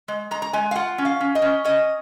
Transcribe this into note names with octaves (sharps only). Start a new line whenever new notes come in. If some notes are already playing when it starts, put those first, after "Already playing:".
G#3
G#3 A#5
A#5
G#3 G#5
F5
F4 F#5
C#4
F5
C#4
D#5
C#4
C#4 D#5